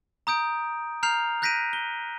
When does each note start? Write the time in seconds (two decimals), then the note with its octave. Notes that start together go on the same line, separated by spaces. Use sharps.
0.27 A#5 D#6 G6 D7
1.03 A#5 F6 G6 C7 F7
1.42 F#6 G6 A#6 B6 D7 D#7
1.73 G7